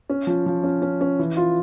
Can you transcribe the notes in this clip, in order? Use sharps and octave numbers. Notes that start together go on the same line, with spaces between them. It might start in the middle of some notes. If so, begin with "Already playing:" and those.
C#4
F3
F3
C#4
C#4
C#4
E3
F4